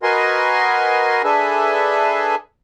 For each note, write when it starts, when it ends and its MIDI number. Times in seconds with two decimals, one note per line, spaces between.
0.03 1.22 66
0.03 1.22 70
0.03 1.22 71
0.03 1.22 75
0.03 1.22 80
0.03 1.22 84
1.24 2.35 62
1.24 2.35 68
1.24 2.35 69
1.24 2.35 71
1.24 2.35 76
1.24 2.35 80